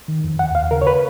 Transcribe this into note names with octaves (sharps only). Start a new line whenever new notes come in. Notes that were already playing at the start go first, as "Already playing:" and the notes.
D#3
F2
D#2 F#5
D#2 F5
C#3 A#4
C#5
B4